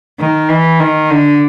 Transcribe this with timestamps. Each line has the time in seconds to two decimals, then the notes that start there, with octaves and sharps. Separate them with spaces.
0.20 D#3
0.49 E3
0.80 D#3
1.10 D3